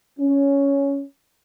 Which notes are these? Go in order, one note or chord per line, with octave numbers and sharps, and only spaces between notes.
C#4